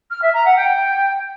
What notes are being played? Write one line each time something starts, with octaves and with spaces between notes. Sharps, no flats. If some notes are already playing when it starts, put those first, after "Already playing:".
F6
E5
A#5
F#5
G5